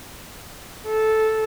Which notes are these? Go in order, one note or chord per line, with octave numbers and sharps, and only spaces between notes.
A4